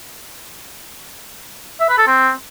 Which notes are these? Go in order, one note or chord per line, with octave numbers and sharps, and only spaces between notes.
E5
B4
A4
C4